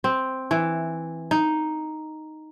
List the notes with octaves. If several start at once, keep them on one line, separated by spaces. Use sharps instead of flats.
C4
E3
D#4